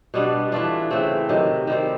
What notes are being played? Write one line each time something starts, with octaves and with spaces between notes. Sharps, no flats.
B2 G3 B3 D4
E3 A3 D4 F4
C#3 E3 A3 C4
C3 D#3 F#3
D#3 G3 C4